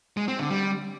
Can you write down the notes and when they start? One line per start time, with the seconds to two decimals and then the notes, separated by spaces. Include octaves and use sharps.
0.17 G#3
0.28 C4
0.39 D3
0.50 G3